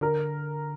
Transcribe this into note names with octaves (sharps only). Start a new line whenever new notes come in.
D3 A#4